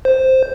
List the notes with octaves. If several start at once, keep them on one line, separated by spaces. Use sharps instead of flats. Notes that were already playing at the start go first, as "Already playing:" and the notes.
C5